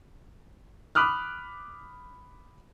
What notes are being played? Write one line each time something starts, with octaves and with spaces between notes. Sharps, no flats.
B5 D6 D#6 F6 F#6